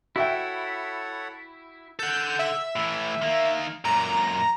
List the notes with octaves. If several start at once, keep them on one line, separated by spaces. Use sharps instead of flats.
E4 F#4 A4 C#5 E5 F#5 G5
A4 F#5 G6
E5
A2 E3
D#3 A#3
F#2 A#2 A#5